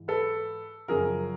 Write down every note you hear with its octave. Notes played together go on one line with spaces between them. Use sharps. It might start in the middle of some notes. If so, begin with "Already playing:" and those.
Already playing: G#2 E3
A4 B4
F#2 C#3 F3 G#4 A#4